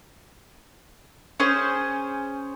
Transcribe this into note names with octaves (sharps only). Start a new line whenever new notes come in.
C#4 G#4 C5